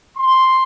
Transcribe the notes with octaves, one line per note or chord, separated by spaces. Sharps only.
C6